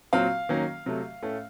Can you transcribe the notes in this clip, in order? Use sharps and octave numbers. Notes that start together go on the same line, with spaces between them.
A#2 F#3 C4 F5
D#3 F#3 A#3 C#4
C3 F#3 A3
A2 A3 C#4